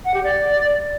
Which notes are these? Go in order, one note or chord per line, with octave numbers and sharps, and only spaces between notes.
F#5
G4
D5